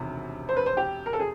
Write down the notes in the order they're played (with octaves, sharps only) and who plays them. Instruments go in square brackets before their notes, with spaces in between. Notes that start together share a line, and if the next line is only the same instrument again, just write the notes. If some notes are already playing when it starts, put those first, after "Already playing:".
Already playing: [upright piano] E1 D2 C3 D#3
C5
B4
C5
G4
A#4
A4
G#4